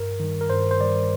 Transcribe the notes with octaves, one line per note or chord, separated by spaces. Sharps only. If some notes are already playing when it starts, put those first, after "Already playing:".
Already playing: G2 A#4
D#3 G3
A#4
G2 C5
C5
D#3 G3 D5